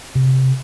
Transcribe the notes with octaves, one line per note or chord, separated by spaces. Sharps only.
C3